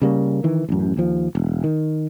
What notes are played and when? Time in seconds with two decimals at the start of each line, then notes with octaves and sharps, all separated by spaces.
0.02 C#3 G3 A#3
0.44 D#3 E3
0.69 A1 F#2
0.97 D#2 F3
1.35 E1
1.64 D#3